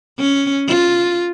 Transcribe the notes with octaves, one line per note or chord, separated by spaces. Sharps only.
C#4
F4